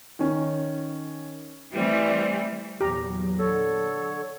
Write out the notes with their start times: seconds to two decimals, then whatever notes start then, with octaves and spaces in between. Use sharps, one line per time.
0.19 D#3 C#4
1.72 E3 G3 A3 C4
2.81 E2 A#2 F#3 G4 A#5
3.39 D3 A4 C#5